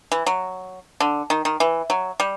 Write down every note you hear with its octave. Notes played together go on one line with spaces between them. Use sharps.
E3
F#3
D3
D#3
D#3
E3
F#3
G3